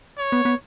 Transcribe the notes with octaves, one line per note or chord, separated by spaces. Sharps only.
C#5
B3
B3